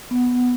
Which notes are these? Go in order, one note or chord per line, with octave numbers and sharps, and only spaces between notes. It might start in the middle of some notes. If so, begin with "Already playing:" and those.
B3